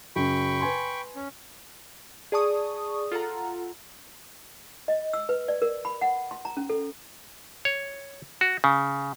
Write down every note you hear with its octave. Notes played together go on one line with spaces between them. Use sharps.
F#2 C#3 G5 B5 C#6
B4 G#5 C6
C#4
G#4 D5 A5 C#6 D#6
F4 A4 F#5 A#5
D#5
E6
B4
D5
A#4
B5
F#5
C6
A#5
C#4
A4
C#5
F#4
C#3